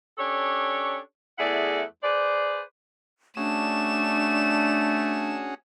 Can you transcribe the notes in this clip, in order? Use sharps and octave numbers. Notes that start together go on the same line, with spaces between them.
C#4 D4 G4 A4 C#5
E2 A3 E4 G#4 D5 F#5
G#4 B4 C5 D5
A3 C#4 D4 F#4 G#4 E7